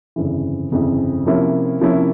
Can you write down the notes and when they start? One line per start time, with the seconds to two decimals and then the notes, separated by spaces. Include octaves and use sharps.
0.16 G1 F2 C#3 E3
0.71 G1 F2 C#3 E3
1.26 C3 F3 A#3 C#4 E4
1.81 C3 F3 A#3 C#4 E4